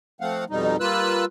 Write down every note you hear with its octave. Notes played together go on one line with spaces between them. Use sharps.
F3 A3 C4 F5 F#5
F2 B2 G3 D#4
G3 A#3 F4 B4 E6 F#6